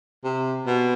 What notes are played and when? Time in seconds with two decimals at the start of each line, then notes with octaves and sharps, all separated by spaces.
0.24 C3
0.66 B2